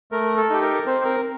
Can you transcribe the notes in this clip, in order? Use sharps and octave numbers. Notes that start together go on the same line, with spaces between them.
A3 A#4
A4
D#4 G4
A#4
C4 C5
A#4